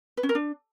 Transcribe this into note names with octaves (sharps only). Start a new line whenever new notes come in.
B4
C#4
A#4
D4